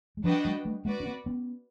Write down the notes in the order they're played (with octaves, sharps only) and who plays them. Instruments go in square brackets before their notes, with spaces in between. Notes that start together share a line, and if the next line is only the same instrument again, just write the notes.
[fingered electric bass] G#3
[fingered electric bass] F3 G3 [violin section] D4 F#4 B4 D#5 G5
[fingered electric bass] F#3 G#3
G3 A3
[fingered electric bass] G#3 A#3 [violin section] F#4 B4 D5
[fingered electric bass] C#4
A#3 C4
B3 C#4